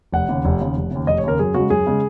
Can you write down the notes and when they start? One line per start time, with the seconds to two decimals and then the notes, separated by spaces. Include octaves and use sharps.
0.12 F1 F#5
0.29 D#2 C#3
0.45 F1
0.61 D#2 C#3
0.77 F1
0.91 D#2 C#3
1.07 F1 D#5
1.18 C#5
1.23 D#2 C#3 A#4
1.39 F#2 G#4
1.54 C#3 G#3 F#4
1.70 F#2 G#4
1.87 C#3 G#3